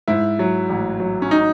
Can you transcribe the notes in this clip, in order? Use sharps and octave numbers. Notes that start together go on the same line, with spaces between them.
G#2 E4
F#3
A1
F#3
C#4
D#4